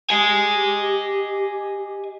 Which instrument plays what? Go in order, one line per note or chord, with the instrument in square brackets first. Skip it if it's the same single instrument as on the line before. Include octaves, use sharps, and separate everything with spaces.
[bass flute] G4 [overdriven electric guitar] D#5 G#5